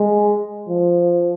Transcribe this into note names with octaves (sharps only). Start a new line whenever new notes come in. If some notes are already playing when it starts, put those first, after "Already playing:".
Already playing: G#3
F3